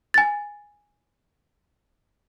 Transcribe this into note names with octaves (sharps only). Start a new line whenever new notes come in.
G#5 A6